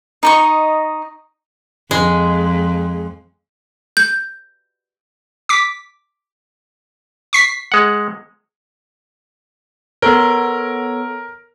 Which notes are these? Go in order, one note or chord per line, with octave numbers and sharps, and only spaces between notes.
D#4 D#5 C#6
F2 G#3
G6
D6 B6
C#6 B6 C7
G#3 F#5
B3 A4 A#4 C#5